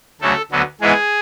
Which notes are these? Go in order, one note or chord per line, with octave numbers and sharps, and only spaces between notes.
D2 C#3 F#3 A3 A4
D2 D3 F#3 B3
G#2 E3 G#3 B3 G#4